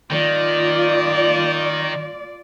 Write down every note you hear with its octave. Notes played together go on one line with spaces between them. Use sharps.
D#3 F4 D5